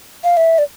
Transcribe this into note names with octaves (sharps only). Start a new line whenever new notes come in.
F5
E5
D5